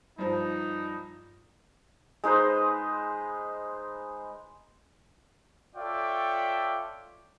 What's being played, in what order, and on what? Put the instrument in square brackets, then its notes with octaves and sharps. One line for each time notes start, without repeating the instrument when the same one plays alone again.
[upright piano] G2 F3 [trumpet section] D#4
[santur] G#3 D#4 B4 C5
[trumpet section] F4 A4 C#5 D5 E5 G5